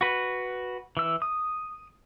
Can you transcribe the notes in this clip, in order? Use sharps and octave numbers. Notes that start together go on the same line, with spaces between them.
F#4 B4
E3 E6
D#6